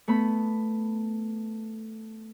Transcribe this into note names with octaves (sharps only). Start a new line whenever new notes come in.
A3 B3 B5